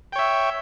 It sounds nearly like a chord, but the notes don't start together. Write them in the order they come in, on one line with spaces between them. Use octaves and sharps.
G5 C#5 E5